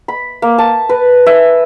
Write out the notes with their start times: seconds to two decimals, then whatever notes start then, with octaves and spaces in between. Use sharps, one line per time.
0.08 B5
0.42 A#3
0.58 A5
0.89 B4
1.26 E5